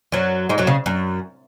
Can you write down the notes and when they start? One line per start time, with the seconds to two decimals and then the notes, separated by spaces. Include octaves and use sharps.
0.12 F#2 F#3
0.49 G#2 G#3
0.58 F#2 F#3
0.67 C#3
0.86 F#2